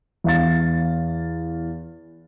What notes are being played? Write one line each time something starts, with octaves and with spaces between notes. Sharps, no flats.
E2 F5 A6